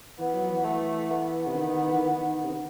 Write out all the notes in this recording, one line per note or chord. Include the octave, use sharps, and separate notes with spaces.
E3 B3
F#3
E3
A3
B3
C3
D#3
E3
D#3
C3
D#3